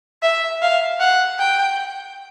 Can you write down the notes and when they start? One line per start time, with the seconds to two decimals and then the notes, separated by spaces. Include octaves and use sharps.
0.22 E5
0.62 F5
1.00 F#5
1.39 G5